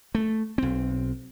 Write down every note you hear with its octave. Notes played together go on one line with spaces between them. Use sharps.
A3
B1 C4